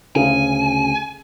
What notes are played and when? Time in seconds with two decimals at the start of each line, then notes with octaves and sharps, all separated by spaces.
0.16 D2 C#3 G#5